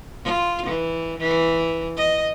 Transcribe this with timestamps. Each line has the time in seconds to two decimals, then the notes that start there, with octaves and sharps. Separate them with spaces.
0.24 F4
0.66 E3
1.18 E3
1.97 D#5